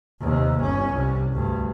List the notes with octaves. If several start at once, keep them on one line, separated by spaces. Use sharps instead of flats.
D#2 C3
G1 C#4
C2 G3
D2 G2